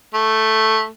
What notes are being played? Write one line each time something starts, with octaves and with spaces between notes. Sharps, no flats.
A3